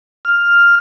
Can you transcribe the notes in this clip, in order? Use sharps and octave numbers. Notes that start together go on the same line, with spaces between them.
F6